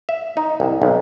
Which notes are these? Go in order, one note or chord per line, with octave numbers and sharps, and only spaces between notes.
E5
D#4
C2
B1